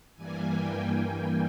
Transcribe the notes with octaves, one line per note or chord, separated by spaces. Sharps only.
G2 E3 G3 A#3 G#5
G5
G#5